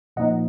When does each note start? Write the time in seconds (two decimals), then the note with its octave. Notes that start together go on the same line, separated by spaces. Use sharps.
0.16 A#2 F3 A#3 D#4 D#5 F#5